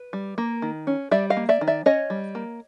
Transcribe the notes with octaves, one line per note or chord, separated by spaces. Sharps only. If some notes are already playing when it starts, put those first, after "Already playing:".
Already playing: B4
G3
A#3
D#3
C#4
G3 D5 E5
D#5 F5
A#3
D5 E5
D#3
D5 E5
C#4 C#5 D#5
G3
A#3